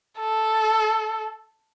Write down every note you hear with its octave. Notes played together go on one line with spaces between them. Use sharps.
A4